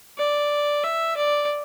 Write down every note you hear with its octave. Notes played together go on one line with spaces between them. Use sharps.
D5
E5
D5